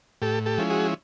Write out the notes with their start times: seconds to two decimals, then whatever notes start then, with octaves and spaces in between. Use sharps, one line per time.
0.22 A2 G4 A4
0.46 G4 A4
0.58 F3 G#3 C#4 E4
0.70 F#4 G#4